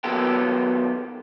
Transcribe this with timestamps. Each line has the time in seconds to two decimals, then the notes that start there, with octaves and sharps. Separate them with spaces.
0.04 D#3 F#3 B3 F4 G4 A4